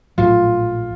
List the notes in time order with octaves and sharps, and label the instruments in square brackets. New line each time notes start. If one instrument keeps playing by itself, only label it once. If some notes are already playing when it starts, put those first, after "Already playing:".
[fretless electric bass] A#1 A2 F#3 [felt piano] F4